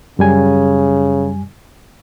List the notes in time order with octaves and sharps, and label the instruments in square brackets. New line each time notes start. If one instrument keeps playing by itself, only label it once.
[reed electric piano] F#2 G3 G#5 [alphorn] C#3